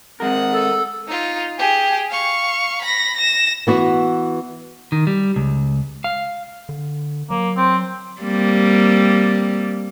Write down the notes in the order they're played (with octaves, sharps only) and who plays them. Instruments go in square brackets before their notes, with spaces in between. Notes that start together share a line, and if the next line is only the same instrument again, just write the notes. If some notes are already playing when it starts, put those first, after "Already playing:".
[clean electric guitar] G#3 A#4 [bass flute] C4 [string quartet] F#5 D#6
[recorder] A4
[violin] D#4 F4
G4 G#4
F5 C#6
B5 A#6
A#6 E7
[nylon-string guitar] E3 B3 F#4
[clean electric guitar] D#3
G3
C#2
F5
[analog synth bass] D3
[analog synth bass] F#3 [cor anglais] A#3
[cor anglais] C4
[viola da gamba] G3 A#3 C4